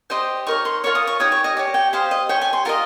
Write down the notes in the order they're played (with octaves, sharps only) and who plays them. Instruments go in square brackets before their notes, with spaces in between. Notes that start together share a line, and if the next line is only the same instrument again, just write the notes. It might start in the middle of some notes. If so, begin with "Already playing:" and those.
[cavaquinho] G4 C5 D#5 C6
D#4 A#4 C#5 C#6
C6
F4 A#4 C#5 C#6
D#6
C#6
D#4 G4 C#5 D#6
C#6
D#5
G4 C#5
G5
G4 C5 D#5 F5
D#5
G4 C#5 G5
G#5
C6
F4 A#4 D#5 A#5